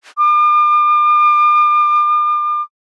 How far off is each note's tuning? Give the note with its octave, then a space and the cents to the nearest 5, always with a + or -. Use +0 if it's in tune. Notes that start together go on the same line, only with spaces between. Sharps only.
D6 +40